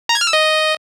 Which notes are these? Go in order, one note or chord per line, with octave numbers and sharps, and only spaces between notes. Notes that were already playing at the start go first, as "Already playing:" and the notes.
A#5
G#6
F6
E6
D#5